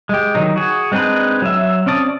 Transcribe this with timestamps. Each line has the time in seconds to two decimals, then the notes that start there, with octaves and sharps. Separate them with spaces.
0.09 G#3 G4
0.35 D#3 F#3 D#4
0.56 F#4 G#4
0.92 G#3 C4 D4 D#4 B4
1.42 F#3 E5
1.86 C4 C#4 D5 A5 D#6